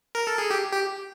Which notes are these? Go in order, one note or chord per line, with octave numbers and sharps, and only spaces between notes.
A#4
A4
G#4
G4
G4